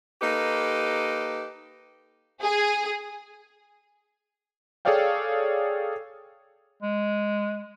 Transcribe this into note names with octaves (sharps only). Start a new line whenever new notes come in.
A#3 D#4 G4 A4 B4
G#4
G#4 A4 C#5 D5 F5 G5
G#3